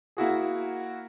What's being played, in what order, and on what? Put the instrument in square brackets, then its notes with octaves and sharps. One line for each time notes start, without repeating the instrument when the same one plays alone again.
[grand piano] A#3 E4 F#4 G#4